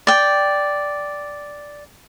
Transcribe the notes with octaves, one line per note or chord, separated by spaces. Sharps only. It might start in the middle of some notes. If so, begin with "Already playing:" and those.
D5 G5